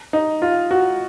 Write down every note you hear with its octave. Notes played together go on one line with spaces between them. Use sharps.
D#4
F4
F#4